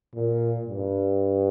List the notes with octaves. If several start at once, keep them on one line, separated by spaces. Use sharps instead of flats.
A#2
G2